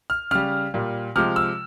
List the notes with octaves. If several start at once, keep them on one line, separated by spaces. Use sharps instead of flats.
F6
C#3 G3 F6
A#2 G3
C3 F3 G#3 F6
E6